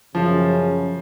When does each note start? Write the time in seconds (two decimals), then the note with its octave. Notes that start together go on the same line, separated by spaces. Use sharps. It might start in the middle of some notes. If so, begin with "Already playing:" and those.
0.15 F#2 C#3 F3